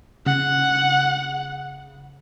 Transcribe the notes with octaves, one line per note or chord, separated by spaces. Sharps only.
C#3 F#5